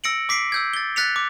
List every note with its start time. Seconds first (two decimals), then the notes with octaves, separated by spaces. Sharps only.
0.04 E6 A#6 C#7 D7 F#7
0.29 D6 B6 C7 D7
0.52 E6 G6 G#6
0.74 A6 G7
0.96 F#6 A6 B6 C#7 F7
1.16 D6